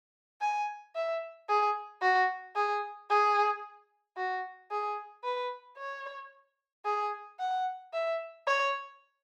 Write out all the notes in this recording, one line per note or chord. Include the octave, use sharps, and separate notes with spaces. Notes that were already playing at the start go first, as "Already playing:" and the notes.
G#5
E5
G#4
F#4
G#4
G#4
F#4
G#4
B4
C#5
G#4
F#5
E5
C#5